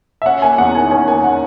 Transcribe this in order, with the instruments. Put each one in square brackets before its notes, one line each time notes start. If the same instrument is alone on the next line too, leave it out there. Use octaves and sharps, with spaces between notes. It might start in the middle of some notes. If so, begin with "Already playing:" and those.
[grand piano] E5
C#4 F#5
A#3 G#5
E2 F#5
D#3 G#5
C#4 G#5
A#3 G#5
F#5